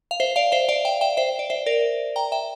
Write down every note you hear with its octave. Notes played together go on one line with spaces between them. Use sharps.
F5
C5 E5
D5 F5
C5 E5
D5 F5
E5 G5
E5 G5
C5 E5
D5
C5 E5
A#4 D5
G5 A#5
E5 G5